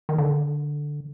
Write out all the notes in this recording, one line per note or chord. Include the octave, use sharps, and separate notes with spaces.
D#3
D3